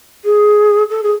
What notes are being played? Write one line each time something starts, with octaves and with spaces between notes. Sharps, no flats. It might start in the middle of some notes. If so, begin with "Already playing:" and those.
G#4
A4
G#4